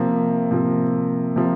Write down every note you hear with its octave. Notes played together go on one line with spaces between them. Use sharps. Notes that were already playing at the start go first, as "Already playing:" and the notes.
Already playing: C3 F3 A#3
C3 F3 A#3
C3 F3 A#3